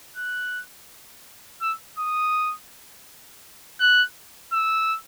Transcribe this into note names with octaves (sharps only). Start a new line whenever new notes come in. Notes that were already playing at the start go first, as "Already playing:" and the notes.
F#6
E6
D#6
F#6
E6